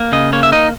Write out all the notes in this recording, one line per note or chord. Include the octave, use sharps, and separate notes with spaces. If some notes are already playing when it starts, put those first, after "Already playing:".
Already playing: A#3
C#3 D#5
A#3 C#5
E5
D#4 D#5